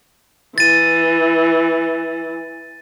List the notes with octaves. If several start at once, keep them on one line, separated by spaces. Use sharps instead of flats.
E3 A6 D#7